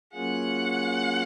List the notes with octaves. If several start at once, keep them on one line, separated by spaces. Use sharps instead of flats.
F#3 A#3 C#4 F4 G#4 F#5